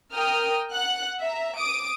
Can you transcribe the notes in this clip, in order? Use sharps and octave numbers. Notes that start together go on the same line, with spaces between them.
A#4 G5 D#6 F6
F#5 F#6
E5 A#5
D6 D#6 D7